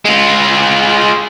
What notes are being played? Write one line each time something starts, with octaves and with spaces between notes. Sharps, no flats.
G#3 F4